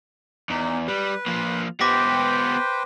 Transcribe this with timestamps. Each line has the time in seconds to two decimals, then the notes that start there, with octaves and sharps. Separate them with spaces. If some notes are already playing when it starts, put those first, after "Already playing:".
0.50 E2 D#4
0.88 G3 B4
1.27 F3 A#3
1.81 B3 G4 B4 C5 G5 D6 A#6 B6